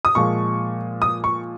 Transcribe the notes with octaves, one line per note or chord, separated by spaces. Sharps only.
D#6
A#2 F3 G#3 C#6
D#6
C#6